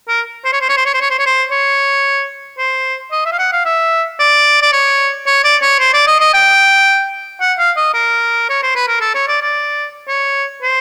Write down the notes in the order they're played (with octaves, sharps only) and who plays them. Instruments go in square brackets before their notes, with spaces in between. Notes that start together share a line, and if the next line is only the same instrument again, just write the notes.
[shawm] A#4
C5
C#5
C5
C#5
C5
C#5
C5
C#5
C5
C#5
C5
C#5
C5
D#5
E5
F5
F#5
F5
E5
D5
D5
C#5
C#5
D5
C#5
C5
D5
D#5
D#5
G5
F#5
F5
D#5
A#4
C#5
C5
B4
A#4
A4
C#5
D5
D5
C#5
C5